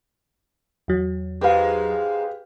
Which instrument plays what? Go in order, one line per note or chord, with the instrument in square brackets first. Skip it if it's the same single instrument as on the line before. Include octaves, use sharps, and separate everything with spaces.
[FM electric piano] E2 F#3
[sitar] G#2 G#3 [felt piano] G4 B4 F5